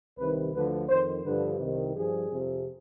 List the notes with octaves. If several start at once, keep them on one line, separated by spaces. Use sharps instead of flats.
C2 C3 D#3 B4
D2 D3 F3 B4
F2 D#3 C5
G2 D3 F3 B4
C2 C3 D#3
G2 F3 G#4
F2 C3 F3